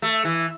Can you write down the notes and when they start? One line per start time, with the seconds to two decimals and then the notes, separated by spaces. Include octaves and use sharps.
0.02 A3
0.25 E3